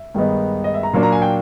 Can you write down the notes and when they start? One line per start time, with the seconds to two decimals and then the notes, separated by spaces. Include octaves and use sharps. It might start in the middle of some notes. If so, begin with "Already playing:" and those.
Already playing: E5
0.14 G2 D#3 G#3 B3 D#4
0.64 D#5
0.74 E5
0.83 A#5
0.93 A#2 F#3 A#3 D4
1.03 A#5
1.12 G#5
1.22 G5